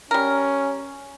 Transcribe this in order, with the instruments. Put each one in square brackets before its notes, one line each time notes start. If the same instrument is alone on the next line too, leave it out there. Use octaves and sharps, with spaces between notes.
[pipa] G3 A#4 [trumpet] C#4